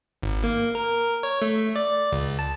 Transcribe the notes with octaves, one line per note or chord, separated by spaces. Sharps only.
G#1
A#3
A#4
C#5
A3
D5
C#2
A5